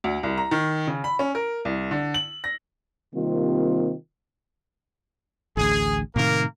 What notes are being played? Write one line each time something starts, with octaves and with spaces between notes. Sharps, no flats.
D2
C2
A#5
D#3
C#3
B5
C#4
A#4
C2
D3
F#7
A#6
C3 D#3 G3 A#3 C4 F4
A1 D2 G#4
A2 C3 D#3 A#3 A#4